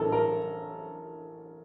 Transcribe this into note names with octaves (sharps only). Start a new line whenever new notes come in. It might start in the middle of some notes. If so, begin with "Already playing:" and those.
Already playing: A1 A2 A4 A#4
A#4